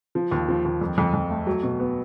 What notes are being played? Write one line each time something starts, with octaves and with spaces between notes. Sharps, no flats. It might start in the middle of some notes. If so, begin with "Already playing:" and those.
F3
D#2
F3
D#2
F2
F2
F2
A3
F#3
B2
B3